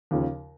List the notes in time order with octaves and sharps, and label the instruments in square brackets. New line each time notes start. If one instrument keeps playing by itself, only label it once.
[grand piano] D#2 C#3 F3